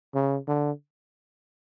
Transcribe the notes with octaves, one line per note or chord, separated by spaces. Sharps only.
C#3
D3